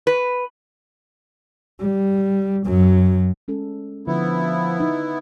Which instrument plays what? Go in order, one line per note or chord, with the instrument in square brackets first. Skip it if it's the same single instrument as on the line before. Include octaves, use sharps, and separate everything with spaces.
[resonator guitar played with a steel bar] B4
[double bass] G3
F#2 F#3
[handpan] G#3 C#4 A4
[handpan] D3 [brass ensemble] F3 [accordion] B3 E4
[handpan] D#4